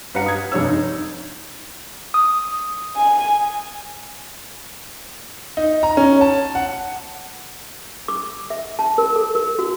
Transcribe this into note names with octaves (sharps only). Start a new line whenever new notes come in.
G2 B4 F5 F#5 A#5 C#7
D#6 G#6
F1 G2 D4 C#5 E6
D#4
D#6
G#5
D#4
A#5
C#4
A5
F#5
D6
E5
A5
A#4
A4
A#4
F#4